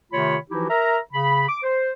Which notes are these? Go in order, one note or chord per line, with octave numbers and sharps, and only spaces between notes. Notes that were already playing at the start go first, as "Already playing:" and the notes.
C3 D#3 A3 F4 C#5 B5
E3 F3 D#4 E4 F#4 G4
A#4 E5 A#5
C#3 B5
D6
C5